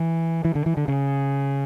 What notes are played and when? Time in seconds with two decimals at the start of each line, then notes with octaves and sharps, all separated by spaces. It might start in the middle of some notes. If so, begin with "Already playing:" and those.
Already playing: E3
0.45 E3
0.55 D3
0.66 E3
0.77 D3
0.88 C#3